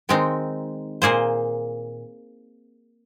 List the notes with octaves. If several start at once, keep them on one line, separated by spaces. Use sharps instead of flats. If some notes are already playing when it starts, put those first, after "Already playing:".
D#3 G#3 C4 D#4
A#2 A#3 G#4 C5